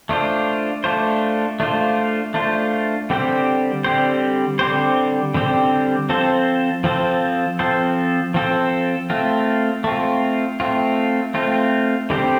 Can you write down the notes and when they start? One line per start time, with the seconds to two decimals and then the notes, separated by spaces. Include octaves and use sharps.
0.09 A3 D4 F4 C5
0.84 A3 D4 F4 C5
1.60 A3 D4 F4 C5
2.34 A3 D4 F4 C5
3.10 D3 G3 C4 G4 C5
3.84 D3 G3 C4 G4 C5
4.59 D3 G3 C4 G4 C5
5.34 D3 G3 C4 G4 C5
6.09 F3 C4 A4 C5
6.84 F3 C4 A4 C5
7.59 F3 C4 A4 C5
8.34 F3 C4 A4 C5
9.10 A3 C4 F4
9.84 A3 C4 F4
10.60 A3 C4 F4
11.34 A3 C4 F4
12.10 D3 G3 C4 G4 C5